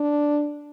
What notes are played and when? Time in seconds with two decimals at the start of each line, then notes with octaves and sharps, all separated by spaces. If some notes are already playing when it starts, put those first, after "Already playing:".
Already playing: D4